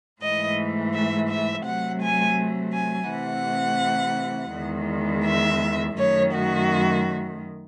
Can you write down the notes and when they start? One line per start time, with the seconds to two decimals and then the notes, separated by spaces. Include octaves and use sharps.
0.21 G#2 E3 A3 D#5
0.93 E5
1.29 E5
1.65 C3 F#3 A3 F#5
2.01 G#5
2.73 G#5
3.09 C3 E3 A3 F#5
4.53 E2 D#3 G#3
5.25 E5
5.96 F#2 D#3 A3 C#5
6.33 F#4